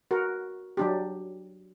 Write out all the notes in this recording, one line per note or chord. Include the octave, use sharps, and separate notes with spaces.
F#4 A#4
F#3 D4 G4